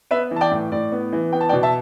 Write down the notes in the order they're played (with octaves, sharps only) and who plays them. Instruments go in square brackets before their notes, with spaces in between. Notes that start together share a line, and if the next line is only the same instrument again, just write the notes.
[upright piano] B3 B4 E5
E3
A5
D5 G5
A2
A2 D5
B3
E3
B3 G5
A5
D5 G5
B2
E5 A5